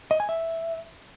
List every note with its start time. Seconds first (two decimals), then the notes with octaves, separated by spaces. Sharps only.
0.11 D#5
0.20 G#5
0.29 E5